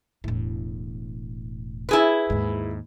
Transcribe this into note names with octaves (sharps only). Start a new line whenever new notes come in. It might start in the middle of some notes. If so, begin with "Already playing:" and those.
E1 A2
E4 G#4 B4
D#2 G#2